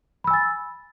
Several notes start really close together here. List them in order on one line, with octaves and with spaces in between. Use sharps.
B5 E6 G#5 A6